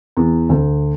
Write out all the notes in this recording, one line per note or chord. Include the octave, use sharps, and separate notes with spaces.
E2
D2